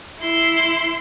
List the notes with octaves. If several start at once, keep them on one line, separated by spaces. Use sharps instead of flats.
E4 C6